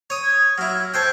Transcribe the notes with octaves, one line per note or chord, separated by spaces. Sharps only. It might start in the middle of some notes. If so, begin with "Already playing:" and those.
C#5 D#6
G#6
F#3 E4 F6
A4 C5 G5 G#6